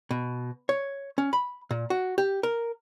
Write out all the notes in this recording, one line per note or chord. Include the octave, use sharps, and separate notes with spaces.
B2
C#5
C#4
B5
A#2
F#4
G4
A#4